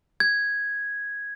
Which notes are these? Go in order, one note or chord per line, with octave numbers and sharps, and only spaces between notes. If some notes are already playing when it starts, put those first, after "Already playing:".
G#6